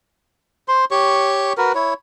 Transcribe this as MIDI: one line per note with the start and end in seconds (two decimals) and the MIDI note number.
0.68 0.85 72
0.68 0.85 84
0.91 1.53 67
0.91 1.53 73
0.91 1.53 85
1.58 1.72 66
1.58 1.72 70
1.58 1.72 71
1.75 1.94 64
1.75 1.94 73